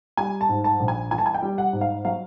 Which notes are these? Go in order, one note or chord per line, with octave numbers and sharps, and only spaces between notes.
G3 G#5
A5
G#2
A5
A#1
G#5
E3 G#5
A5
G#5
G5
G3
F#5
G#2
F5
F#3 F5